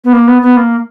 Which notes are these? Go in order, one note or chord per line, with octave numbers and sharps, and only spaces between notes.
B3
A#3
B3
B3
A#3